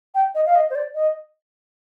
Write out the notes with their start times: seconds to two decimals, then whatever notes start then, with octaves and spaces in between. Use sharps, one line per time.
0.15 G5
0.35 D#5
0.46 F5
0.55 D#5
0.70 C5
0.75 D5
0.95 D#5